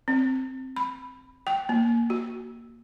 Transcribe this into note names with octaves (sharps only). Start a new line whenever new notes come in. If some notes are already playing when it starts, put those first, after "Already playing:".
C4
B5
G5
A#3
F#4